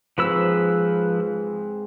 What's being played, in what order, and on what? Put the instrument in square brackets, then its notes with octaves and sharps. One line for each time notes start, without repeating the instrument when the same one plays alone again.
[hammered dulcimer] G#2 C4 G#4 [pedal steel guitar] F3 B4 E6